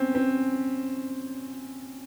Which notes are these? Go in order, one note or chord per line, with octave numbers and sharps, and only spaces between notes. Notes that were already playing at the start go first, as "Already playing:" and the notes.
Already playing: C4 C#4
C4